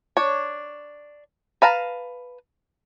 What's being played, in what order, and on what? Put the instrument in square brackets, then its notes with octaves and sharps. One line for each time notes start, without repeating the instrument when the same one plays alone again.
[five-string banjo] D4 C#5
B4 F5 A5 A#5